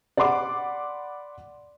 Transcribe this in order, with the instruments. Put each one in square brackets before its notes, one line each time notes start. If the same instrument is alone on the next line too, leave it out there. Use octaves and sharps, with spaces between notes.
[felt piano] D5 F#5 B5 C6 D6